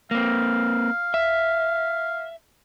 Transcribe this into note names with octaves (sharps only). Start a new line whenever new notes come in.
A#3 C4 F5
E5